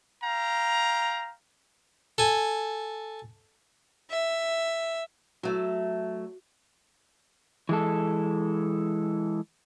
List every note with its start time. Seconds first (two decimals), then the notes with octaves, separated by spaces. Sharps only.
0.23 F5 G5 A#5
2.18 A4 G#5
4.10 E5
5.43 F#3 A3 F#4
7.69 E3 G#3 A4